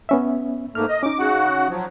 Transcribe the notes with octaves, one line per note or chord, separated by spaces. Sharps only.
B3 C#4 E5
G#2 A3 A#3 F6
D#5
C#4 D#4 D6
C#3 F#4 F#5
F3 F#3